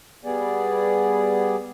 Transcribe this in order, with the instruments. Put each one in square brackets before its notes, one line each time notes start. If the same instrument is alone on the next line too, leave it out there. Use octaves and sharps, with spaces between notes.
[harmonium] G3 B3 G#4 D5